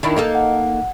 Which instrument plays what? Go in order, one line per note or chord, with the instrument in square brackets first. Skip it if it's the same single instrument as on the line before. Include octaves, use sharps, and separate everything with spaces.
[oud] D#3 D4 E4
[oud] A#3 D#4 A4 [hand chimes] D#5
[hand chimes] F#5